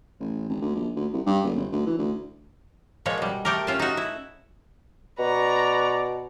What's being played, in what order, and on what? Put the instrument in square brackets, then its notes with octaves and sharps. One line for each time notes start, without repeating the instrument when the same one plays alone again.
[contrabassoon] A1
G#1
D2
A#1
D2
C2
G2
F#1
G1
D2
E3
D2
[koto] A#2 F3 G#3 C#5
B2 G3
A3 G4 A#4
C#4 F4 A5
D#4 F#4
E4
[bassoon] B2 [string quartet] B4 A#5 C#6 [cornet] D5